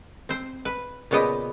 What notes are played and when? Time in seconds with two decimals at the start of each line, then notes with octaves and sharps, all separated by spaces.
0.29 C4 C5
0.65 B4
1.11 A#2 C#3 B3 G4 D#5